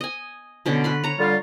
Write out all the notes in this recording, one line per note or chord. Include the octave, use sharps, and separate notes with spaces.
D#5 G#5
B2 D3 C#4
B4 B5 C6
C#5 A#5
D3 G3 F4